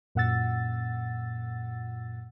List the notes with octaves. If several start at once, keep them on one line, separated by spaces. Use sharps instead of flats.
F#2 A#2 F#5 E6 A6